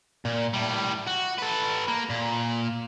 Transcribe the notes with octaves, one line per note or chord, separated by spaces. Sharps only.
A#2
A2 G3
F#4
A4 B4
A#3
A#2